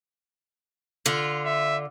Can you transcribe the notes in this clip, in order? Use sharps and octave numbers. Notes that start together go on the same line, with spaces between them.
D3 F4
E5